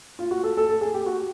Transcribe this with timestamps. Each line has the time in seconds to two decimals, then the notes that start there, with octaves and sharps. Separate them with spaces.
0.19 F4
0.31 F#4
0.43 A4
0.57 A4
0.69 A4
0.81 G#4
0.94 G4
1.06 F#4